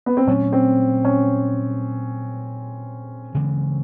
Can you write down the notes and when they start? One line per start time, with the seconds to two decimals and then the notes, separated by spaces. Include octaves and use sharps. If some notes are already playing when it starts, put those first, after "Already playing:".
0.06 B3
0.17 C4
0.27 A#2 F#3 A3 C#4
0.53 C4
1.05 C#4
3.34 C#3 E3 G#3 C4